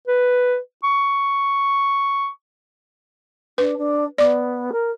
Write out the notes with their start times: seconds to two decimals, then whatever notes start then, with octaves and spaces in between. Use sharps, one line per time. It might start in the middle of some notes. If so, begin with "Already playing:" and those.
0.07 B4
0.84 C#6
3.58 D4 B4
3.78 D4
4.18 B3 D5 D6
4.72 A#4